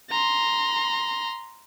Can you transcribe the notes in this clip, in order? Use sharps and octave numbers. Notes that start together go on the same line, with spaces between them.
A#5 C6